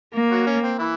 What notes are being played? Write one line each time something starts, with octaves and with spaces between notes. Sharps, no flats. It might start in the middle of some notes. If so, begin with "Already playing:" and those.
A#3
F#3 F#4
C#4
C4
E3 E4